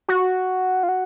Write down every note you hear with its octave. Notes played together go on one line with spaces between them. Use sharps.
F#4
F4
F#4